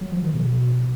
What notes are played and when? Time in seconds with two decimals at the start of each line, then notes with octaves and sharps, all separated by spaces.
0.01 F#3
0.12 F3
0.23 D#3
0.34 B2